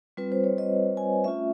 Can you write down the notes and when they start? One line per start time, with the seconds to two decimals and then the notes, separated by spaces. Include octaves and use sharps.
0.17 G3 C4 F4 B4
0.32 C5
0.44 C#5
0.58 D#5
0.97 G#5
1.24 A3 C#4 F4 E5